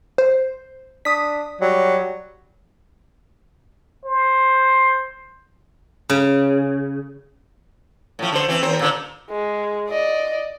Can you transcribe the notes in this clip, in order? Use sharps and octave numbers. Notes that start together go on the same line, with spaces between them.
C5
D4 D#6 B6
F#3 G3
C5
C#3
A2 F3
D3 C5
E3 C4
D#2 C4 C5
A#2 D3
G#3
D5 D#5